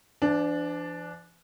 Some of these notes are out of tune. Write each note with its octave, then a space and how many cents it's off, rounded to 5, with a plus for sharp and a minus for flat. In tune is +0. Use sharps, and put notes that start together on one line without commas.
F3 -45 D4 +0